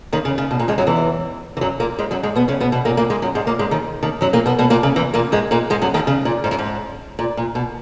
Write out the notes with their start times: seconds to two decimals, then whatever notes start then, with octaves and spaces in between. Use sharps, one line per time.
0.13 D#2 D#3
0.25 C#3
0.38 C#3
0.51 B2
0.59 A#2
0.68 G#2 G#3
0.78 F#2 F#3
0.87 E2 E3
1.57 E3
1.61 F#2 F#3
1.80 A#2 A#3
1.99 G#2 G#3
2.11 F#2 F#3
2.23 G#2 G#3
2.35 B2 B3
2.48 C#3 C#4
2.60 B2 B3
2.72 B2 B3
2.85 A#2 A#3
2.97 A#2 A#3
3.10 G#2 G#3
3.22 F#2 F#3
3.35 G#2 G#3
3.47 A#2 A#3
3.59 G#2 G#3
3.71 D#2 D#3
4.03 D#2 D#3
4.21 F#2 F#3
4.33 A#2 A#3
4.46 B2 B3
4.59 B2 B3
4.70 A#2 A#3
4.83 C#3
4.96 E2 E3
5.14 A#2 A#3
5.32 G#2 G#3
5.51 A#2 A#3
5.70 G#2 G#3
5.82 F#2 F#3
5.94 D#2 D#3
6.07 C#3
6.25 A#2
6.44 G#2
6.51 F#2
6.59 G#2
7.19 A#2
7.37 A#2
7.55 B2